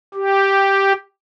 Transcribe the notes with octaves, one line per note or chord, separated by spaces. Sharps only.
G4